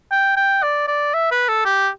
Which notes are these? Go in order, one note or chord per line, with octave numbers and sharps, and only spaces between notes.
G5
G5
D5
D5
E5
B4
A4
G4